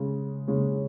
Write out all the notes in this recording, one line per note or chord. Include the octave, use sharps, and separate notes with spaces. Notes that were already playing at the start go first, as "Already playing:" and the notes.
Already playing: C#3 G#3 C#4
C#3 G#3 C#4